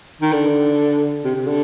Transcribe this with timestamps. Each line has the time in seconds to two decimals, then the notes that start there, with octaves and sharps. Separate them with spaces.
0.22 D#3
0.33 D3
1.24 C3
1.35 C3
1.47 D3